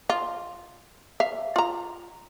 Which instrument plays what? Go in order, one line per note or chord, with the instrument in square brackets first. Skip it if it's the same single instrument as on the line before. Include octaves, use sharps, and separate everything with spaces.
[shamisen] F4
E5 F5
F4 A#5